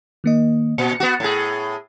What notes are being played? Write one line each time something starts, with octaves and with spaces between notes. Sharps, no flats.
D#3 A#3 D#5
A#2 C#7
B3 F#4
A2 G#4